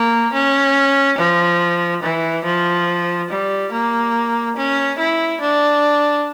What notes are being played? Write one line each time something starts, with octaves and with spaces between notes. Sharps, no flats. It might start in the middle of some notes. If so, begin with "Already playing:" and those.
Already playing: A#3
C#4
F3
E3
F3
G3
A#3
C#4
E4
D4